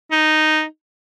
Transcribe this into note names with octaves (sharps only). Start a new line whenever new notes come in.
D#4